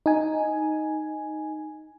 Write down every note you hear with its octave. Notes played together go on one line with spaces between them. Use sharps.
D#4 G#5